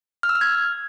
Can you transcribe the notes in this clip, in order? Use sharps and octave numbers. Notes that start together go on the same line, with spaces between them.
F6
E6
F6
G#6